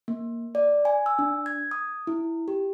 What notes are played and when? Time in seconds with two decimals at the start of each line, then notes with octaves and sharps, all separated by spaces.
0.08 A#3
0.55 D5
0.85 G#5
1.06 E6
1.19 D4
1.46 G#6
1.71 D#6
2.07 E4
2.48 G4